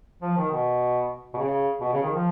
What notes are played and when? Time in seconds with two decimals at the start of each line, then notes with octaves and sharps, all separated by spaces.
0.22 F3
0.37 D#3
0.51 B2
1.34 B2
1.38 C#3
1.81 B2
1.93 C#3
2.04 D#3
2.14 F3